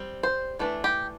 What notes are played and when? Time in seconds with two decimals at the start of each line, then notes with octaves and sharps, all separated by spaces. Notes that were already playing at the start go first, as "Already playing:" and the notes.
Already playing: G3 C4
0.23 C5
0.59 E3 A3 D4
0.84 G4